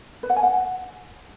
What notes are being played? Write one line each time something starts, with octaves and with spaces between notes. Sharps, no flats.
B4
F#5
G#5
F#5